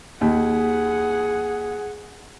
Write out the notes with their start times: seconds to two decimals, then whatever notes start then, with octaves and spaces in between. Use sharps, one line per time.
0.21 D#2 G#4 F#5